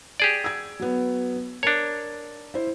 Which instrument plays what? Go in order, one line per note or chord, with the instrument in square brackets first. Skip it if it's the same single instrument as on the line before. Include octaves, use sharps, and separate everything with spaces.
[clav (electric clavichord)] G4 G#4 D5
[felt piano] E6 G#6
F#3 B3
[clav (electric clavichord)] D4 C#5 [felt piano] A#4 A5
[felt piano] E4 C5